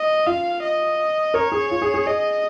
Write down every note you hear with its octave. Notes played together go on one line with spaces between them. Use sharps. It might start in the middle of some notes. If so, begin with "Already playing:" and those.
Already playing: D#5
F4 F5
D#5
A#4 C#5
G#4
F4
G#4
G#4
G#4 D#5